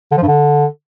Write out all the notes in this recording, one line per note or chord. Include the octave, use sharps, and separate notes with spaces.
D3
F3
G2
D3